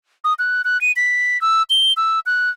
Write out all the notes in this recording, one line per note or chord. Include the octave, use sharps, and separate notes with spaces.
D#6
F#6
F#6
D#7
B6
E6
G7
E6
F#6